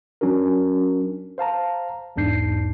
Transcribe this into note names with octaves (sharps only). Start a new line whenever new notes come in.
F#3 C#4 D4 F#4 A#4
C5 F5 A5 A#5
B1 E2 G#2 D4 G6 C7